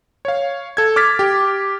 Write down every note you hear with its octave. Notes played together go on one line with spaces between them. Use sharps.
C#5 F5
A4 G#6
D6 F6 A6 B6
G4